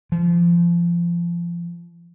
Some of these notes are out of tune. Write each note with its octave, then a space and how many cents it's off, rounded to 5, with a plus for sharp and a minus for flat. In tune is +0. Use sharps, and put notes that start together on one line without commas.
F3 -25